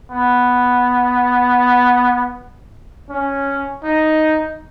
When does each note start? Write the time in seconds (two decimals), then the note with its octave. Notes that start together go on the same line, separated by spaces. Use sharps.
0.11 B3
3.09 C#4
3.84 D#4